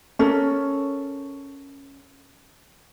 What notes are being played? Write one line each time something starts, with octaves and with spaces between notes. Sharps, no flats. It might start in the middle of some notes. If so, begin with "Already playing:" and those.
C#4 A4 A#4